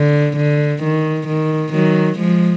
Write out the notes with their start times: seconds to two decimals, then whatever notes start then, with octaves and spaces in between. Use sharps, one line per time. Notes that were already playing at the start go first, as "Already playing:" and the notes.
Already playing: D3
0.37 D3
0.83 D#3
1.28 D#3
1.73 D#3 F#3
2.19 F3 G#3